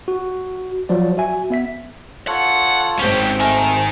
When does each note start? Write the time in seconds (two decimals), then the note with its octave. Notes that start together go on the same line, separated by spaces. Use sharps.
0.08 F#4
0.89 F3 F#3 D5
1.17 F#4 E5 G#5
1.50 B3 E5 B6
2.28 F4 A4 C#5 F#5
2.99 G#1 G#2 C4 C#4 G4
3.40 A3 D#4 A#4 G#5